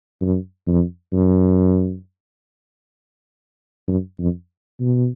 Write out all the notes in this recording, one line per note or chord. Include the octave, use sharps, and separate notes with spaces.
F#2
F2
F#2
F#2
F2
B2